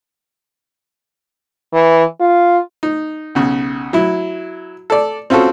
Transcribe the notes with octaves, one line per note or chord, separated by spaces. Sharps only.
E3
F4
D#4
B1 C#3
F#3 E4
A4 D5
C4 C#4 F4 F#4 A4